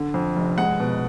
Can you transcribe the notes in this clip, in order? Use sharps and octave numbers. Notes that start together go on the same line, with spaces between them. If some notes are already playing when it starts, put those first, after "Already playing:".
Already playing: D3
F2
F1
G#3 F#5
B2